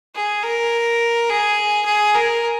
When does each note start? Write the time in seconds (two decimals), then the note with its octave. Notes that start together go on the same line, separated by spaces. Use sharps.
0.15 G#4
0.43 A#4
1.30 G#4
1.86 G#4
2.15 A#4